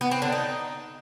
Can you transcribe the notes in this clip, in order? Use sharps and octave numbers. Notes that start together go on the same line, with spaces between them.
B3
C4
D3
D#4